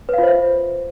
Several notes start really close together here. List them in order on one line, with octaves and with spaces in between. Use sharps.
B4 F5 F4 C5 E5